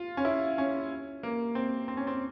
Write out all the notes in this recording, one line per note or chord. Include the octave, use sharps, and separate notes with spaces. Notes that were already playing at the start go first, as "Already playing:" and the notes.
Already playing: F4
C#4
E4
C#4
A#3
C4
C4
C#4
C4